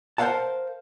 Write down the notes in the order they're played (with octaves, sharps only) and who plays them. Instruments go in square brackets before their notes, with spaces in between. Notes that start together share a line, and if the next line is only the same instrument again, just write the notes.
[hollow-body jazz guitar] A#4 C5 D5 F5 F#5 A5